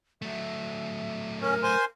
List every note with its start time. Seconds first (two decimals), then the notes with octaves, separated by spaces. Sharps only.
0.22 F#3 A3 E5
1.41 C#4 A#4
1.63 C5 G#5 C6